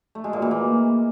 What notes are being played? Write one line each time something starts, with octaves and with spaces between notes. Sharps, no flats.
A3
G#3
A#2
E3
A#3